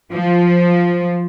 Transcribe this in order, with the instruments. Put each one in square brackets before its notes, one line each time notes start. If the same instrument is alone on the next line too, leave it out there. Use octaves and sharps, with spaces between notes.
[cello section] F3